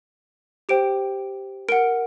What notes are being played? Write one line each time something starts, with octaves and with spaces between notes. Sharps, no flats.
G4 C5 G5 D7
A#4 F#5 D7